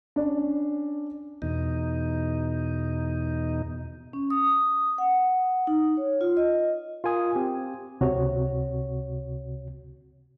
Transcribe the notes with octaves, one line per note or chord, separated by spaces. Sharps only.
C#4 D4
E2 B2 D#4
C#4
D#6
F#5
D#4
C#5
F4
D#5
F4 A#4 G#5 D#6
C4 G4
C#2 C3 F#4 C#5